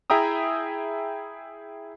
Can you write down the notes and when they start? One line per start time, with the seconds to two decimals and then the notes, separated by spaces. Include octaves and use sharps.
0.10 E4 G#4 E5 G5 A#5 D#6